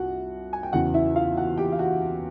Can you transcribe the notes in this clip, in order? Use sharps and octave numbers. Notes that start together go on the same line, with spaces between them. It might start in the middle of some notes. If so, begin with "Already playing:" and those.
Already playing: C2 F4 F#4 F#5
G#5
G5
E2 C#3 E3 F#4 F#5
E4 E5
F4 F5
F#4 F#5
G4 G5
F5
F#4 F#5